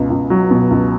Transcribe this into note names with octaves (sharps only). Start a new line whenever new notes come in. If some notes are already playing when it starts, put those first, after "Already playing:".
Already playing: C#2 B2
C#2
F#3
B2
C#2